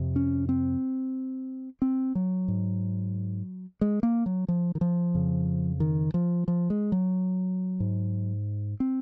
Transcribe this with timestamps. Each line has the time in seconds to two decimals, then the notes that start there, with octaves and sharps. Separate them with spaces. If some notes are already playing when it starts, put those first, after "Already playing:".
Already playing: F2 C3
0.16 C#4
0.49 C4
1.82 C4
2.15 F#3
2.48 G#2
3.81 G#3
4.03 A#3
4.26 F#3
4.48 F3
4.75 D#3
4.81 F3
5.14 F2 C#3
5.80 D#3
6.14 F3
6.48 F3
6.70 G#3
6.92 F#3
7.80 G#2
8.80 C4